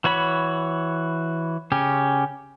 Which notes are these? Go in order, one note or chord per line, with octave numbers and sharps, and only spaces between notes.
E3 F#4 C#5 B5
C#3 C#4 G4